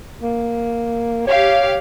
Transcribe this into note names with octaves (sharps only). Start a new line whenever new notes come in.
A#3
G4 C#5 F5